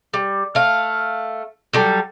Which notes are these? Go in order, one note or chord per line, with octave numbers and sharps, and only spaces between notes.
G3
A3 F5
F#3 G3 A4